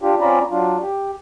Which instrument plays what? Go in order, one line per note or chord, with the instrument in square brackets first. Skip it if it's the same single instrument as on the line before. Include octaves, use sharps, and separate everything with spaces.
[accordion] D4 F4 G4
C4 C#4 F4 D5 A#5 B5
F#3 D4 F4
G4